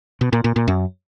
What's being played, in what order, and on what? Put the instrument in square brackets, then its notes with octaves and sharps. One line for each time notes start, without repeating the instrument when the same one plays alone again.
[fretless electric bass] B2
A#2
A#2
A#2
F#2